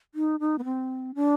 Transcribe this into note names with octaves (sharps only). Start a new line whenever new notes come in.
D#4
D#4
B3
C4
D4